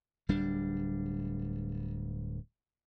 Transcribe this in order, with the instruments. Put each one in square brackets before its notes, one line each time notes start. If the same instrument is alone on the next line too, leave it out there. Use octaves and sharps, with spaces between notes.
[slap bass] D1 G3 D4